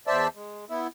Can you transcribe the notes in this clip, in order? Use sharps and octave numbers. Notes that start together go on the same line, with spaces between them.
E2 C5 D5 E5 A5 E6
G#3
B3 E4